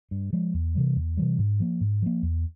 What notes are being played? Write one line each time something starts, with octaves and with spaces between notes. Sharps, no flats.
G2
F3 G#3
E2
C3 E3 G3
E2
C3 E3 G3
G#2
F3 A#3
G#2
F3 A#3
E2